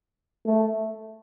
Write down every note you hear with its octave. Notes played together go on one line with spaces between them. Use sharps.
A3